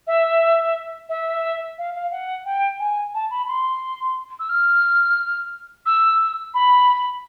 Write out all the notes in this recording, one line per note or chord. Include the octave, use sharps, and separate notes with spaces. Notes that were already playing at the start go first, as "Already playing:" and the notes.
E5
E5
F5
F5
F#5
G5
G#5
A5
B5
C6
E6
F6
E6
B5